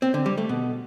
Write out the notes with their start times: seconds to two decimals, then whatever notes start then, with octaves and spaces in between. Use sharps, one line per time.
0.02 C4
0.14 D3
0.26 G3
0.38 A3
0.49 B2